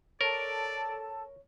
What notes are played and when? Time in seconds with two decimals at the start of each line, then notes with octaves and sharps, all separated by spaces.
0.21 A4 A#4 C#5 D5 A5